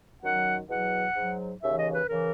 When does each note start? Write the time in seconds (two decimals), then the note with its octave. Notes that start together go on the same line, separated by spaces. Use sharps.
0.23 F#2 D#3 F#3 F#5
0.69 E2 B2 F#3 F#5
1.16 G#2 F#3
1.63 D#2 C#3 E3 E5
1.78 D#5
1.94 B4
2.09 C#3 E3 A#4